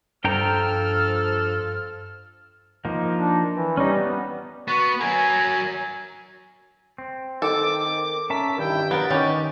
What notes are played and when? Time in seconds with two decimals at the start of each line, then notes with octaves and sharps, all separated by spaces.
0.24 G2 F3 D4 A4 G5 A#5 F6
2.85 F3 A#3 D#4
3.16 D4
3.54 E3
3.77 G3 C#4 D#4
3.93 B3
4.68 B3 F#4
5.01 F#3 A#4 G#5
6.98 C4
7.42 D#3 A4 D6
8.30 C#4 A#4 E5 A5 B6
8.58 G2 D#3 E4 G5
8.91 F#3 B3 A#4 A6
9.10 D#3 C#4 D#4 G4